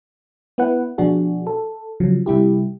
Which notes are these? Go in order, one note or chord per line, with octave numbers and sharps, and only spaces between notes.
B3 E4 B4 F#5
B2 F3 D4 F#4 G#4
A4
C#3 F3 F#3
C3 G3 E4 G4